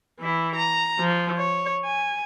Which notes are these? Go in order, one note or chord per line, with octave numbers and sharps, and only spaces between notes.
E3 E4
A#5
F3
C#5
G#5